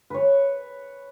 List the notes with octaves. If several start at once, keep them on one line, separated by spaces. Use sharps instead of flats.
B4 C#5